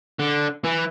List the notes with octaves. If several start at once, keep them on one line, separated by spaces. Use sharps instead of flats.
D3
E3